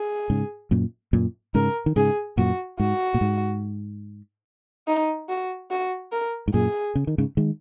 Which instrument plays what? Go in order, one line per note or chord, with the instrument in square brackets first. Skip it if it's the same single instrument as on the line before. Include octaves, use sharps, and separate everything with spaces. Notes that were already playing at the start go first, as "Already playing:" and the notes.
Already playing: [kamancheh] G#4
[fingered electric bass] G#2 C#3
F#2 A#2
F#2 A#2
[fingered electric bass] G#2 C#3 [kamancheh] A#4
[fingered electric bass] D#3
[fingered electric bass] G#2 C#3 [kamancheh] G#4
[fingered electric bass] F#2 A#2 [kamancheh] F#4
[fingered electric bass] G#2 [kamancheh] F#4
[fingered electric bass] A#2
G#2
[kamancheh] D#4
F#4
F#4
A#4
[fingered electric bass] G#2
[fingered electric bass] F#2 A#2 [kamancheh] G#4
[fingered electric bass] C#3
D#3
G#2 C#3
D#3 G#3